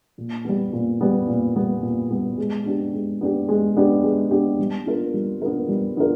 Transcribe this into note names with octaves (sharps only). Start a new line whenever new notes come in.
A#2
G3 B3
A#2
G3 B3
A#2
G3 B3
A#2
G3 B3
G#3
B3 D4 G4
G#3
B3 D4 G4
G#3
B3 D4 G4
G#3
B3 D4 G4
G3
B3 D4 F4 A#4
G3
B3 D4 F4 A#4
G3
B3 D4 F4 A#4